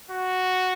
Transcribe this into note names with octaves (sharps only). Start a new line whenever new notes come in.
F#4